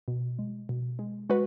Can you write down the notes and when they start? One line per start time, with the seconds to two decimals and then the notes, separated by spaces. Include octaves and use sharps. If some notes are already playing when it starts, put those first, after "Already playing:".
0.08 B2
0.39 G#3
0.69 B2
0.99 G#3
1.30 G#3 F#4 B4